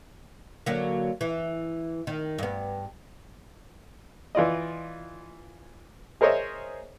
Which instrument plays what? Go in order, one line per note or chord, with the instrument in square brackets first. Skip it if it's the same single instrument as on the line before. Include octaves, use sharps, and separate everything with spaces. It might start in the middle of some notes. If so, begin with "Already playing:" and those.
[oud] D3 F#3 A#3
E3
D#3
G2 B3
[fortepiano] E3 F4 D5 D#5
G#4 A#4 C5 C#5 D#5 E5